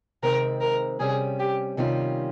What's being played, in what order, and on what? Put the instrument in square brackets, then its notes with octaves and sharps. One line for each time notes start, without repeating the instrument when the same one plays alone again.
[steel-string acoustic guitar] C3 D#3 G#3 C4 [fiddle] A#4
[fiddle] A#4
[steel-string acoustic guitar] C3 G3 C#4 [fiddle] G#4
[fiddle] G4
[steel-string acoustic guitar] C3 D#3 G3 C#4 F4